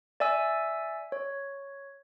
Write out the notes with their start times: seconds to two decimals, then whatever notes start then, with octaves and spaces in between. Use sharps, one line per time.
0.20 D5 E5 G#5 E6
1.12 C#5